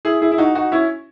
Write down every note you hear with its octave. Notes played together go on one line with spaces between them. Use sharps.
E4 G#4
E4 G#4
E4
D#4 F#4
D#4 F#4
C#4 E4